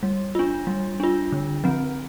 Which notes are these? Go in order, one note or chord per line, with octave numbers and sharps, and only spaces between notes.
G3
D4 F4
G3
D4 F4
D3
F3 C4